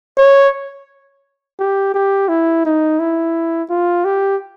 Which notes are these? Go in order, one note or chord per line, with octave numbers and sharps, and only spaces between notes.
C#5
G4
G4
E4
D#4
E4
F4
G4